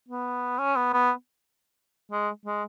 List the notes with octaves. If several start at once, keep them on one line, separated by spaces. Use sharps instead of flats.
B3
C#4
B3
B3
G#3
G#3